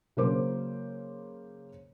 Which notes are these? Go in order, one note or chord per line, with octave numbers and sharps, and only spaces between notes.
C#3 F#3 A#3 A#4 C5 D6